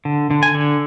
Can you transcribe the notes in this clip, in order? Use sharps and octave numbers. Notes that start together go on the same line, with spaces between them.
D3
D3
G#5
D3